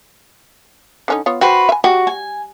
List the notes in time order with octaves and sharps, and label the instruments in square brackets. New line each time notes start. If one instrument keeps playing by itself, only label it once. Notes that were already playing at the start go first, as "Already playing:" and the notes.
[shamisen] D3 C#4 D#4
B3 F4 C#5
[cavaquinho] F#4 B4 C5 [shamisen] G5
[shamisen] E5 G#5
[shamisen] G3 [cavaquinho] F#4
[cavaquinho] G#5